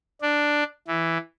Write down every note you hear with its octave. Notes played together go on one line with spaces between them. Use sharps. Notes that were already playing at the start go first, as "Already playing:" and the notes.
D4
E3